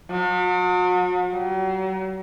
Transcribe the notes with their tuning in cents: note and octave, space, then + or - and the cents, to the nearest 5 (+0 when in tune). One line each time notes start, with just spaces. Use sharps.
F#3 -40
F#3 +45